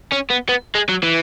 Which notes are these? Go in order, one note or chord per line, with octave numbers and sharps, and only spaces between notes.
C#4
B3
B3
G#3
F#3
E3